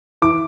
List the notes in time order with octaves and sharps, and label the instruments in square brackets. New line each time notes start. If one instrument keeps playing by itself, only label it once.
[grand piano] E3 D6